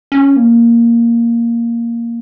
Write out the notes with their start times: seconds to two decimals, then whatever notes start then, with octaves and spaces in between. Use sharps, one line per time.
0.12 C#4
0.36 A#3